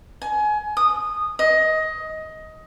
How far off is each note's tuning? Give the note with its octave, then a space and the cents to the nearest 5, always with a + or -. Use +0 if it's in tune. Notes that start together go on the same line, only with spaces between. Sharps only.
G#5 +25
D#6 -15
D#5 +15